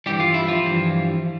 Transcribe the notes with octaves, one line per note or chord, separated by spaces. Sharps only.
G2 E3 G3 G4
F4
E4
F3 F4
G2 E3 G3